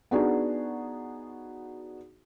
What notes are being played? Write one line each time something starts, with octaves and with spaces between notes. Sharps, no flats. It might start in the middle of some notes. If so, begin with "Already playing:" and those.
B3 D4 D#4 F#4 G#4